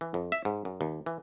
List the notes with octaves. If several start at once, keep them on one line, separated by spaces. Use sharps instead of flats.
E3
F2
E5
G#2
F#2
D#2
E3